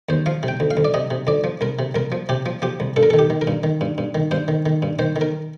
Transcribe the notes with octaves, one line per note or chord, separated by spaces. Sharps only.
D#2 C5
F3 F5
C3
G5
D2
F5
D2
D5
C3 D#5
C3
D2 D5
F3
C2 A#4
C3
C2 A#4
F3
C3 G4
F3
F3 G4
C2
G2 A4
A#4
A4
D#3
G4
D#3
A#4
G2
D#3
G2
G2
D#3
G2 C5
D#3
D#3
G2
D#3 C5
D#3
A#4